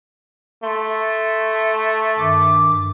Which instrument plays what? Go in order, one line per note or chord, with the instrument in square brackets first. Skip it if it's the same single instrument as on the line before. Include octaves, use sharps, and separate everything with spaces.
[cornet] A3 [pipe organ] C6
[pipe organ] G2 D#3 D6